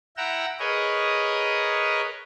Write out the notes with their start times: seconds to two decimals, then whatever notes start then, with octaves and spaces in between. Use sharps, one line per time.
0.17 E4 F#5 G5 A#5 E6
0.59 G#4 A#4 B4 C#5 D#5